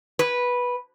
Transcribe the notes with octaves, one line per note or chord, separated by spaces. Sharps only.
B4